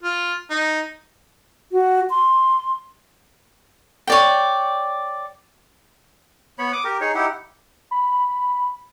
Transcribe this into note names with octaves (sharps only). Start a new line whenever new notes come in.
F4
D#4
F#4
C6
C#5 D5 G5
B3 C#5 B5
D6 D#6
G4 A#4
D#4 G#4 C#5
D#4 E4 G4 F#5
B5